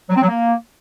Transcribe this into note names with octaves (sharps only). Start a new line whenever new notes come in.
F#3
C4
F#3
A#3